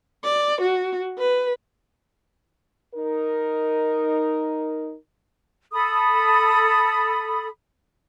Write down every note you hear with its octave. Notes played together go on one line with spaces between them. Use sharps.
D5
F#4
B4
D#4 A#4
A4 B5 D#6